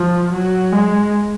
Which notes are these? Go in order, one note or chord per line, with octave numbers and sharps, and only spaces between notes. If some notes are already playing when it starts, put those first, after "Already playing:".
Already playing: F3
F#3
G#3